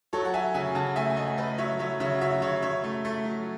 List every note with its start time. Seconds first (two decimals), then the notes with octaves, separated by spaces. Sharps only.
0.13 F#3 A4 C#5
0.25 F#5
0.34 F#3 E5 G#5
0.54 C#3 E5 G#5
0.75 C#3 F#5 A5
0.96 A3 E5 G#5
1.10 G#5
1.16 A3 D#5 F#5
1.37 A3 B4 D#5
1.58 F#3 C#5 E5
1.79 F#3 C#5 E5
2.00 C#3 C#5 E5
2.14 F#5
2.21 F#3 C#5 E5
2.42 C#3 C#5 E5
2.62 C#3 C#5 E5
2.84 A3
3.05 A3
3.25 F#3